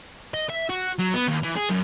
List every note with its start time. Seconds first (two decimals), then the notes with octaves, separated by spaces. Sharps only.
0.34 D#5
0.49 E5
0.69 F#4
0.99 F#3
1.14 B3
1.27 D#2
1.43 E3
1.55 G#4
1.69 F#2